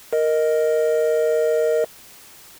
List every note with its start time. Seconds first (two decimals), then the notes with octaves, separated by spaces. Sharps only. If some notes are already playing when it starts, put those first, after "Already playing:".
0.13 A#4 D#5